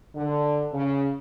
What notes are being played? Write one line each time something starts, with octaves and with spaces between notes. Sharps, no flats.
D3
C#3